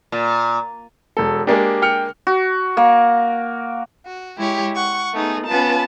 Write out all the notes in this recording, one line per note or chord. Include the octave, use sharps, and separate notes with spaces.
A#2
E1 A4
G#3 A#3 D4 G4
G5 F6 C#7
F#4
A#3
F#4
G#3 E4 G4 C#5
F#5 C#6
A3 B3 D#4 G#4
B3 C#4 F4 B4 A5